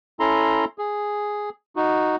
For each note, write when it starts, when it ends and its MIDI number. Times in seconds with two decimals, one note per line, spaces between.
0.20 0.65 61
0.20 0.65 64
0.20 0.65 69
0.20 0.65 82
0.20 0.65 84
0.78 1.50 68
1.76 2.16 63
1.76 2.16 66